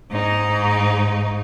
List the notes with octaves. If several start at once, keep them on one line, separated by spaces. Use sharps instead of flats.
G#2 D#4